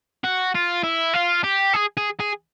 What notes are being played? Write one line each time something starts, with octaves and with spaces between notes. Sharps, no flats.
F#4
F4
E4
F4
G4
G#4
G#4
G#4